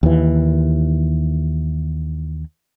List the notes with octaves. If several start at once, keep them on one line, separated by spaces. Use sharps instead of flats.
D#2 E3